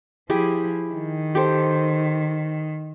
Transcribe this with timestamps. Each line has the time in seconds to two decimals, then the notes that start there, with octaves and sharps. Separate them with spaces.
0.30 F3 E4 G4 G#4
0.93 D#3
1.35 G4 A4 C5